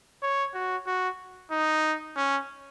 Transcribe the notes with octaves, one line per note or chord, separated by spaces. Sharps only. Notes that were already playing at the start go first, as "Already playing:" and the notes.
C#5
F#4
F#4
D#4
C#4